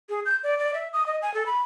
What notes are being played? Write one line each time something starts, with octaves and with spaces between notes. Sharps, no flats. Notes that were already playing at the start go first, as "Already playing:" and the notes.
G#4
G6
D5
D5
E5
D#6
D#5
G#5
A4
B5